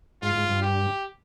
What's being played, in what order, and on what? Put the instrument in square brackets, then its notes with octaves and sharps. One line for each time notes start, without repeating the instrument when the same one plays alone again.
[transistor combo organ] G#2 [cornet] F4
[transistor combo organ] G#2
G2
[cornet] G4